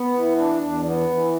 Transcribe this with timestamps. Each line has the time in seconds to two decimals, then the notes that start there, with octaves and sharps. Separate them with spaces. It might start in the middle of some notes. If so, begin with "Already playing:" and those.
Already playing: B3
0.14 E3
0.37 D4
0.61 E2
0.85 B3
1.09 E3